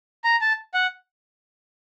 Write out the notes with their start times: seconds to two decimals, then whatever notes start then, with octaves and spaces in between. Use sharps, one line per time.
0.24 A#5
0.41 A5
0.74 F#5